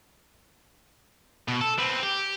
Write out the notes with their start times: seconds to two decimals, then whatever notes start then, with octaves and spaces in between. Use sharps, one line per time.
1.48 B2
1.61 A4
1.79 C4 B4
2.03 G4